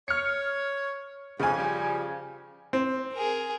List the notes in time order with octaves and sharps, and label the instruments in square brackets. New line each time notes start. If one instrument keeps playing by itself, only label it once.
[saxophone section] C#5 [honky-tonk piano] F6 C#7
[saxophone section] F2 G#2 [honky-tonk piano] C#3 G#5
[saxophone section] F3 G3
[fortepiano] C4
[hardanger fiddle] G#4 A#4